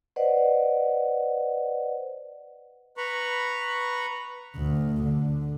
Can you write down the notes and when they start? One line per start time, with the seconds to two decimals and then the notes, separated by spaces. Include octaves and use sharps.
0.16 B4 C5 D5 D#5 F#5
2.97 B4 A#5 B5 C#6
4.56 D2
5.04 D3